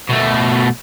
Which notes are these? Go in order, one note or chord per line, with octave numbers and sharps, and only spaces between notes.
B2 A3